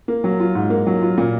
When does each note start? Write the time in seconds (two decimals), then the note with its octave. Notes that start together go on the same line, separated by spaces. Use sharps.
0.08 A#3
0.24 F#3
0.40 F4
0.55 G#2
0.70 A#3
0.87 F#3
1.02 F4
1.18 A#2